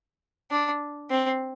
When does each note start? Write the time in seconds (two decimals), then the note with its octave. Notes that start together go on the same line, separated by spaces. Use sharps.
0.51 D4
1.10 C4